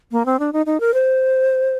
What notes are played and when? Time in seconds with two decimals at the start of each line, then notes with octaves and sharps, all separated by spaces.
0.12 A#3
0.26 C4
0.39 D4
0.53 D#4
0.66 D#4
0.80 A#4
0.94 C5